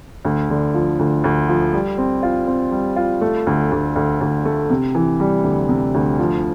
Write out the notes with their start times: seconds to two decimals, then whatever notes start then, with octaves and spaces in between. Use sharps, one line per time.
0.25 D2
0.50 D3
0.74 F3
0.99 D2
1.24 D2
1.48 F3
1.73 G3
1.98 C4
2.23 F4
2.47 C4
2.72 G3
2.96 F4
3.21 A3
3.47 D2
3.71 D2
3.96 D2
4.21 D2
4.45 A3
4.70 C3
4.95 E3
5.20 G3
5.44 D2
5.69 C3
5.94 D2
6.19 F3